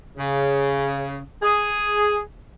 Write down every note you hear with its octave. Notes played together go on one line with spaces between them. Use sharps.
C#3
G#4